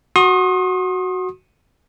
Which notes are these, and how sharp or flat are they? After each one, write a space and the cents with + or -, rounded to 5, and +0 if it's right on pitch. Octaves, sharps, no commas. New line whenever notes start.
F#4 +0 C6 +40 D#6 +0